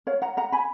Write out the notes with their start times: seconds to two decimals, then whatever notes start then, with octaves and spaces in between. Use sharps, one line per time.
0.07 C#5 F5
0.22 F#5 A#5
0.37 F#5 A#5
0.52 G#5 B5